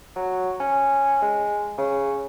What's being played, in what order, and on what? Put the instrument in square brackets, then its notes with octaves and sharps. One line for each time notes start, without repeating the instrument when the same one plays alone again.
[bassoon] F#3
C#4
G#3
C#3